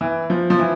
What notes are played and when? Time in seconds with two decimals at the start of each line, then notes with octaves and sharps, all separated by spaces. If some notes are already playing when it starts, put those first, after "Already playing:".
0.01 E3
0.30 F3
0.50 F3
0.59 E3